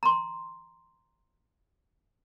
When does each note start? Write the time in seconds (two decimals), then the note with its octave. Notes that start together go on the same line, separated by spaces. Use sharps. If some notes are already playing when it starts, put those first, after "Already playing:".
0.03 A#5 C6